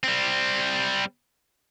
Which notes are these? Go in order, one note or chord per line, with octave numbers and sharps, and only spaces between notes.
G3 C4